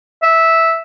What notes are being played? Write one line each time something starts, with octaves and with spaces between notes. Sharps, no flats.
E5